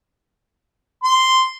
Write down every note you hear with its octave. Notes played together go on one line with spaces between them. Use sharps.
C6